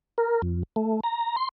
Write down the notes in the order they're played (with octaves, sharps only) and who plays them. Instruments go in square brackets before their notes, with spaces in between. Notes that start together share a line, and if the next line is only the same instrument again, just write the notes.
[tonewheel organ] A#4
F2
A3
A#5
C6